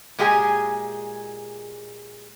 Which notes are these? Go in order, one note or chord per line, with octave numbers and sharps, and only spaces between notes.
A#2 G#3 G4 G#4 G#5